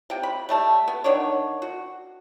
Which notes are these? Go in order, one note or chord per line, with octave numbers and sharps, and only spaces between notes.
C3 G5
B5
G3 A3 A5
B3
D3 D#3 D4 C#5
F#4